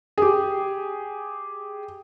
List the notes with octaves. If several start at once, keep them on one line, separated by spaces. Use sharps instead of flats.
G4 G#4